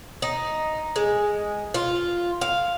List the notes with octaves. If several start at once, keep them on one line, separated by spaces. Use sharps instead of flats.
D#4
G#3
F4
F5